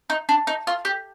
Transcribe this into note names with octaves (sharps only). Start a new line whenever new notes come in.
D#4
D4
D#4
F4
G4